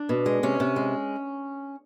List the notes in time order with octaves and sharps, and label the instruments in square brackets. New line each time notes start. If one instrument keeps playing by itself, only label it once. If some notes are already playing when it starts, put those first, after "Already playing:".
Already playing: [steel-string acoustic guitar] D4
B2
G#3
C3 C#4
C3
G#3